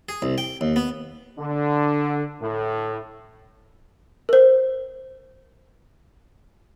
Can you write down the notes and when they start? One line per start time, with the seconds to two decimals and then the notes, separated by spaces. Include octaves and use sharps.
0.09 G#4
0.22 C2
0.38 G5
0.61 D#2
0.76 B3
1.39 D3
2.41 A2
4.29 A#4 C5